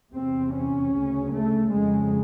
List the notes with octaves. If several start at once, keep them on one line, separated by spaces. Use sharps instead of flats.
E2 C3 C4
C#4
D2 C#3
A3
F2 C#3 G#3